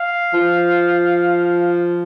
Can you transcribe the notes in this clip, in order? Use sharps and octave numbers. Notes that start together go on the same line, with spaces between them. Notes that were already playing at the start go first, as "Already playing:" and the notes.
Already playing: F5
F3